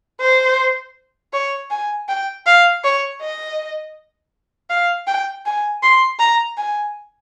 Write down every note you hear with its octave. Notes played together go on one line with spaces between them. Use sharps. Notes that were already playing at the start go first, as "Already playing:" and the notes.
C5
C#5
G#5
G5
F5
C#5
D#5
F5
G5
G#5
C6
A#5
G#5